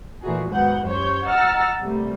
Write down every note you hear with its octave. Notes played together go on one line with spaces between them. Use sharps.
A#2 E3 A3 D#4 F#4 G#4
D#2 G#2 F#3 B3 F#5 G6
F#2 G4 C5 C#5 G6
D#5 F#5 A#5 E6 F6 A6
C3 G3 A3 A#3